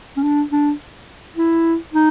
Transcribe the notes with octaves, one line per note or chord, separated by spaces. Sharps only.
C#4
D4
D4
E4
D#4